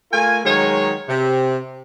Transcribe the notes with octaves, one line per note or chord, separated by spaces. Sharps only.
A3 F4 A#4 G#5
D#3 F#3 G#3 C#5
C3